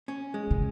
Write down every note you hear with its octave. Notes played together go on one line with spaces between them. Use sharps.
C#4
G#3
C#3